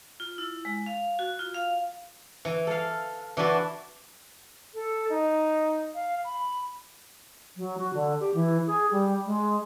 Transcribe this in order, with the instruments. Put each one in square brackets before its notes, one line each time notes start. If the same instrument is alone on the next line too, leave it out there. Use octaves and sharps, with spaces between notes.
[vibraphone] F4
E4
G#3
F5
F#4
F4
F5
[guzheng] E3
A4 F5
E3 D4 F#4 B4 A5
[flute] A4
D#4
F5
B5
[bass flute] F#3
F#4
D3
G4
E3
G#4
G3
G#3